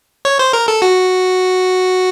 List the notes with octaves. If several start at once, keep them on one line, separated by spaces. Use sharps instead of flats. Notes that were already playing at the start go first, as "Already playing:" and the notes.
C#5
C5
A#4
A4
F#4